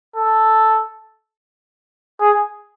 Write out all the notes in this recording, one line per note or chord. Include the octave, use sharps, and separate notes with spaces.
A4
G#4